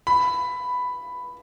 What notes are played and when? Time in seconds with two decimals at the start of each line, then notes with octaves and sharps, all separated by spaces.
0.07 B5